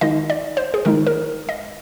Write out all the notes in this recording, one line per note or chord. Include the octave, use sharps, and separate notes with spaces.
D#3 G#3 D#4 D#5
D5
C5
G#4
D#3 G#3 D#4 A#4
A#4
D#5